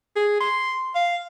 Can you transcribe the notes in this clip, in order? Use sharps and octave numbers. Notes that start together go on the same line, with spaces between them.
G#4
C6
F5